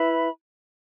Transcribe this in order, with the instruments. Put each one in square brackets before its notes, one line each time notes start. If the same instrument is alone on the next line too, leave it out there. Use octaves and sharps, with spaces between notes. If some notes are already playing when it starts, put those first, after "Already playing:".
Already playing: [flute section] E4 B4 E5 B5